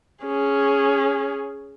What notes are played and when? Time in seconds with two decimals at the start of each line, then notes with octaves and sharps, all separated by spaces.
0.24 C#4 G#4